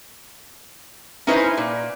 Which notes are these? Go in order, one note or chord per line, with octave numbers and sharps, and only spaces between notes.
C#4 D#4 E4 B4 C5
A#2